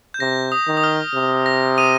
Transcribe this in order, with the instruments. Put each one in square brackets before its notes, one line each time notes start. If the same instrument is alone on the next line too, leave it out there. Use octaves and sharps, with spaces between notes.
[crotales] G6
[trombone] C3 [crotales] A#6
[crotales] D#6
[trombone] D#3
[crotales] D#6
F6
[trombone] C3
[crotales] A#6
D#6 D#7